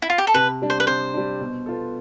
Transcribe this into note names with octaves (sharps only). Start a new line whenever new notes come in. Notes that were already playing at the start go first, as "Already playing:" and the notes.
E4
F4
G4
A4
C3 B4
G3 D4
C5
B4
C3 C5
G3 D4
B2
B3 F4 A4